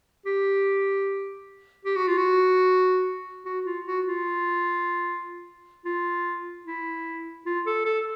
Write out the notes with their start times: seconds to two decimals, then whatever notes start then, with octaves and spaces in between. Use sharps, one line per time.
0.26 G4
1.85 G4
1.96 F#4
2.08 F4
2.17 F#4
3.46 F#4
3.66 F4
3.86 F#4
4.06 F4
5.85 F4
6.65 E4
7.46 F4
7.66 A4
7.85 A4